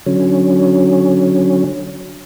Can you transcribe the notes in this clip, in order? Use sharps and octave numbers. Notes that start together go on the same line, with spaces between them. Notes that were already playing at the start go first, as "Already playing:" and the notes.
D3 F#3 C#4